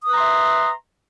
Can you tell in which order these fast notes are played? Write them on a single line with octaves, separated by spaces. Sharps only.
D#6 B4 A#5 C6 E5